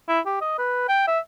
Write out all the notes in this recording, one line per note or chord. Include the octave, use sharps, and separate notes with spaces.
E4
G4
D#5
B4
G5
E5